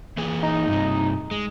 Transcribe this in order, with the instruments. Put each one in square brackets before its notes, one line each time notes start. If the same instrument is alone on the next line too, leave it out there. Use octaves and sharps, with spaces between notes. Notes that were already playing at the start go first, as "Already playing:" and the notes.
[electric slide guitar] E3 A#3 G#4
[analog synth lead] D#4
[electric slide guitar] G2 C3
G#3